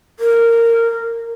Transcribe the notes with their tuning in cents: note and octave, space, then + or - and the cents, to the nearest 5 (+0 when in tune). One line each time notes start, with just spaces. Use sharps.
A#4 -15